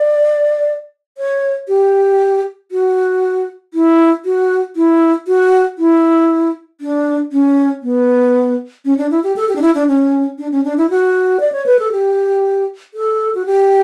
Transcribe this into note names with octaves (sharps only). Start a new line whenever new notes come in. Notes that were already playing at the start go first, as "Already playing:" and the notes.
Already playing: D5
C#5
G4
F#4
E4
F#4
E4
F#4
E4
D4
C#4
B3
C#4
D4
E4
G4
A4
G4
D4
E4
D4
C#4
D4
C#4
D4
E4
F#4
D5
C#5
B4
A4
G4
A4
F#4
G4